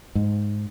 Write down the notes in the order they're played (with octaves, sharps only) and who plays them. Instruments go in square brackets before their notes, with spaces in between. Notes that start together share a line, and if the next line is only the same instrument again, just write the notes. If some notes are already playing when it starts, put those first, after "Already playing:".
[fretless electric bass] G#2